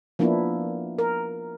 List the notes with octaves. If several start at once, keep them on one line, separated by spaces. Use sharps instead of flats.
F3 A#3 B3 D4 E4
A#4